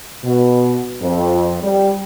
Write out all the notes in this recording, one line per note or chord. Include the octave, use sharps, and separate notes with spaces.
B2
F2
G3